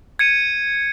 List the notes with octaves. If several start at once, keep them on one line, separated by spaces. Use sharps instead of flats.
G#6 C#7 D#7